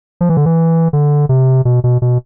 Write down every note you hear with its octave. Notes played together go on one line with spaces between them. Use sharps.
F3
E3
D3
E3
D3
C3
B2
B2
B2